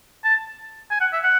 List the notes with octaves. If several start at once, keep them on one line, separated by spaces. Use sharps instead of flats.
A5
G#5
F#5
E5
F#5